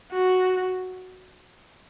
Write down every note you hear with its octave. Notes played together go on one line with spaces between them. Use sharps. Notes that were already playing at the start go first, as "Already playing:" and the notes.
F#4